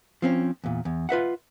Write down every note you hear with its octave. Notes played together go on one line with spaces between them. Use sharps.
F3 C4 C#4
E2 A#2
E2
F4 B4 E5 F#5